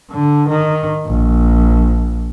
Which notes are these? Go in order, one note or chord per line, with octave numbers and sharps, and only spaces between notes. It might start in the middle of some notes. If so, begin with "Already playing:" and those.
D3
D#3
A#1